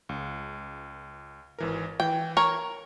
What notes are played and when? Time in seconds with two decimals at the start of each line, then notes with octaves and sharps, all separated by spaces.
0.09 C#2
1.59 G#1 E3 A#4
2.00 E3 G5
2.37 A#4 C#5